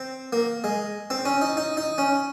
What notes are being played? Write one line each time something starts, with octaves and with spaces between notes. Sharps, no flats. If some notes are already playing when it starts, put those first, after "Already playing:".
Already playing: C4
A#3
G#3
C4
C#4
D#4
D#4
D#4
C#4